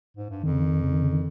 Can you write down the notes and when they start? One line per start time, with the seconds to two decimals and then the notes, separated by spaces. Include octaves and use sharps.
0.17 G#2
0.30 G2
0.43 F2 D#3
0.52 C#3
0.60 D#3
0.83 C#3
0.93 D#3
1.02 C#3
1.12 D#3